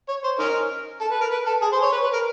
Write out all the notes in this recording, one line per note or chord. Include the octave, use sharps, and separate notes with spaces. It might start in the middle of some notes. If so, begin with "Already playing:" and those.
C#5
C5
C#4 D#4 A#4
A4
B4
A#4
B4
A4
G#4
C5
C#5
B4
B4
A#4